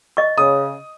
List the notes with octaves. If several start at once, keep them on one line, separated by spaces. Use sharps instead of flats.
D#5 C#6
C#3 D#6